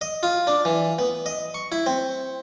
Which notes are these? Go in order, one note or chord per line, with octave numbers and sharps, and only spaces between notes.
D#5
F4
D4
E3
B3
D#5
C#6
E4
C4